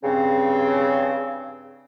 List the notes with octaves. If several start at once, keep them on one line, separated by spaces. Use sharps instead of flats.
G2 C#3 C4